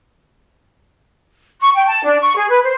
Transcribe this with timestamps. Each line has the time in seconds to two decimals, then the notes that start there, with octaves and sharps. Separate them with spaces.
1.61 C#6
1.75 G5
1.87 A5
2.04 D4
2.21 C#6
2.37 G#4
2.49 B4
2.64 C5